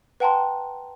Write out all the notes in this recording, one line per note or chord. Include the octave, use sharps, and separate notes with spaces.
B4 F#5 G5 A5 A#5 C6